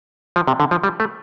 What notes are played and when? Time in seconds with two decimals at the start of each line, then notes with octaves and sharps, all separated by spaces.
0.36 F3
0.47 C3
0.60 D3
0.71 F3
0.84 G3
1.00 A3